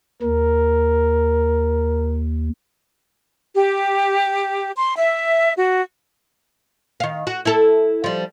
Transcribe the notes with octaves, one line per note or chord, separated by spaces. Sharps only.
D#2 A#4
G4
C6
E5
F#4
D#3 F5
F#4
E4 A4
F3 G3